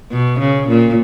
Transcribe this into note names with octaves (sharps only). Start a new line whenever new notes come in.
B2
C#3
A#2